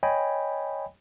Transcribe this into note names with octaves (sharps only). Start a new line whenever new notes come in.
C#5 D#5 G5 G#5 B5